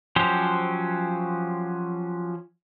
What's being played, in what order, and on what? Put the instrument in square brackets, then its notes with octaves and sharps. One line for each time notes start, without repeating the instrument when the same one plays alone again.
[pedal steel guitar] F3 F#3 C#4 G4 C5